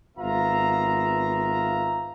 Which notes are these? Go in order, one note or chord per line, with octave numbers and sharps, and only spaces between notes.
G#1 B3 F4 E5 A#5